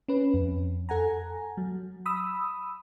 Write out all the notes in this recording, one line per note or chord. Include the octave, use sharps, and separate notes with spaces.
C#4 B4
F2
A4 F#5 G#5 A#5
F#3
B5 D#6 E6